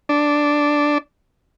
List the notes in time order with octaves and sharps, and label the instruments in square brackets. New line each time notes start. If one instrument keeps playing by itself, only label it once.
[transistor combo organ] D4